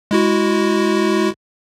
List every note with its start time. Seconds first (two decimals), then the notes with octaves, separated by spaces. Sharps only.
0.11 G#3 E4 F#4